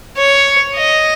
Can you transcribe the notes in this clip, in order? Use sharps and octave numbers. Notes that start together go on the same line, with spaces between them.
C#5
D#5